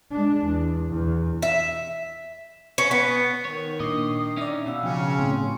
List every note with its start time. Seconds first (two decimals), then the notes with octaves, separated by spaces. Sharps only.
0.11 G#3 D4
0.45 E2
0.90 E2
1.42 E5
2.78 C#4
2.91 B3
3.45 D#3 C#5
3.80 A#2 D4 D#5 C7
4.37 C#4 D#4 D5 E5
4.66 B2 F5 F#5 E6
4.83 C#3 F3 C#4 G5
5.19 A2 C4